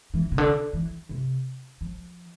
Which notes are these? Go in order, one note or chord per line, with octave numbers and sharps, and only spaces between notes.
E3
C3
D3
E3
C3
F3